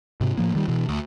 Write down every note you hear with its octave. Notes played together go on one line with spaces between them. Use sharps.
G#2 C3
A2 F3 A#3
D#3 G3
B2 E3
D2